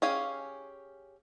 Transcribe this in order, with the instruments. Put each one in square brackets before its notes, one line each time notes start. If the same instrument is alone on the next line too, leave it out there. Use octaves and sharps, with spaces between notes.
[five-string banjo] C#4 G4 G#4 F5 G#5